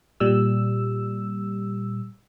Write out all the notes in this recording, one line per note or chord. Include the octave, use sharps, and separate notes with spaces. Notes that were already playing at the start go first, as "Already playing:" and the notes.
A#2 G3 E6